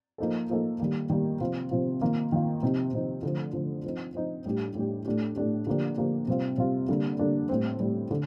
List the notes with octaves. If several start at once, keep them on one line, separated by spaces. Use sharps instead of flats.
F3 A#3 D#4 A4
F3 A#3 D#4 A4
D#3 G3 A#3
D#3 G3 A#3
C3 F3 C4 F4
C3 F3 C4 F4
D#3 A#3 F4
D#3 A#3 F4
C3 F3 C4 D#4
C3 F3 C4 D#4
D3 F3 A3
D3 F3 A3
F3 C4 D#4
F3 C4 D#4
A2 G3 D4 G4
A2 G3 D4 G4
A2 A3 D4 G4
A2 A3 D4 G4
D3 F3 A#3 D4 G4
D3 F3 A#3 D4 G4
C3 G3 C4 F4
C3 G3 C4 F4
D3 G3 A#3 D4
D3 G3 A#3 D4
A2 G3 C4
A2 G3 C4
D3